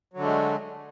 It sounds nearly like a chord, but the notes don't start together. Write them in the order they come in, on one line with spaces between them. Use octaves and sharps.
F#3 D3 A3 G#3